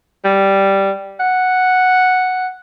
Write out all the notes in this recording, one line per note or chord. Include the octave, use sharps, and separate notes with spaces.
G3
F#5